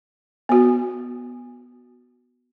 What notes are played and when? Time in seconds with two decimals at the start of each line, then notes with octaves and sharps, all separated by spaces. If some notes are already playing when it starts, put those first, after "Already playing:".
0.49 B3 F#4